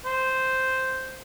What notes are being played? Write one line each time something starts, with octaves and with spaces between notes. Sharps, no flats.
C5